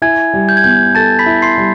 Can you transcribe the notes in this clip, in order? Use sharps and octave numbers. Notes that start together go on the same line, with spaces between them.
E4 G#5 G#6
G3
G6
G#6
B3 G6
A4 A5 A6
B5 B6
E4
C6 C7
G3